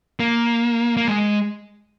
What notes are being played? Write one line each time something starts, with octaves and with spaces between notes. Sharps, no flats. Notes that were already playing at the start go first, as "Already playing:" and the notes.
A#3
A#3
G#3